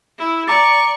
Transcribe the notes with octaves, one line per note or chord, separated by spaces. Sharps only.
E4
D5 A#5 C#6 D6 A6